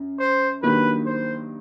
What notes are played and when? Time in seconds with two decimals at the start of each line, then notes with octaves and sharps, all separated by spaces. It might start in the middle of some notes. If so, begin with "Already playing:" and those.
Already playing: F#2
0.19 C5
0.63 G2 D#3 F#3 A#3 B4
1.06 C5